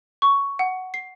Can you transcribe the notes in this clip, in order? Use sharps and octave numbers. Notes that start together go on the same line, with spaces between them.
C#6
F#5
C7